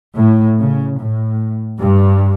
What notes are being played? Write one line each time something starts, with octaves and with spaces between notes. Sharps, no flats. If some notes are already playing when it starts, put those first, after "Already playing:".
A2
C#3
A2
G2